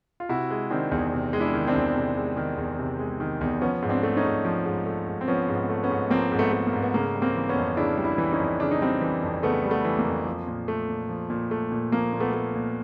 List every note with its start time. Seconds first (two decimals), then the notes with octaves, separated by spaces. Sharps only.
0.20 F4
0.29 C3 E4 F#4
0.50 G#3
0.70 D#3 C4 D4
0.92 E2
1.12 C3
1.33 G#3
1.40 D4 E4
1.53 D#3
1.67 C4 D4
1.75 E2
1.96 C3
2.16 G#3
2.37 D#3
2.58 E2
2.79 C3
2.99 G#3
3.20 D#3
3.41 E2
3.61 F3 B3 C#4
3.82 G#2
3.89 C4 D4
4.03 A3
4.17 C#4 D#4
4.25 G#2
4.45 F3
4.65 G#2
4.86 A3
5.07 G#2
5.21 C4
5.28 F3 B3 C#4
5.48 G#2
5.55 B3 C#4
5.70 A3
5.83 B3 C#4
5.90 G#2
6.11 F3 A#3 C4
6.32 G#2
6.39 A3 B3
6.53 A3
6.67 A#3
6.73 G#2
6.83 B3
6.94 C#3 A#3
7.15 G3
7.22 A#3 C4
7.35 E3
7.49 B3 C#4
7.56 F2
7.77 C#3 D4 E4
7.97 G3
8.05 D4 E4
8.18 E3
8.32 C#4 D#4
8.39 F2
8.60 C#3 D4
8.71 D#4
8.81 G3 C4 D4
9.01 E3
9.23 F2
9.43 C#3 A3 B3
9.64 G3
9.71 A3 B3
9.85 E3
9.99 A#3
10.06 F2
10.26 F3
10.47 A#2
10.68 A3
10.89 A#2
11.09 F3
11.30 A#2
11.51 A3
11.72 A#2
11.92 F3 A#3
12.13 A#2
12.20 A3 B3
12.34 A3
12.55 A#2